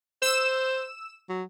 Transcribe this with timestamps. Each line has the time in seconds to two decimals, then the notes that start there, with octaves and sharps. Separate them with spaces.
0.22 C5 E6 E7
1.29 F#3